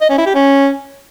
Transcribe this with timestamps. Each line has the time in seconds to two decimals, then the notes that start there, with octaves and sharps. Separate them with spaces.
0.01 D#5
0.10 C#4
0.18 E4
0.26 G4
0.35 C#4